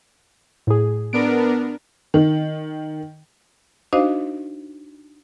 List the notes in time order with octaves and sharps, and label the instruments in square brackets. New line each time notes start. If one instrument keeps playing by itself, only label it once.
[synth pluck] A2 G#4
[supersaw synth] B3 D4 A#4 [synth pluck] D7
[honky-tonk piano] D#3
[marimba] D4 D#4 F#4 C5 D#5 F5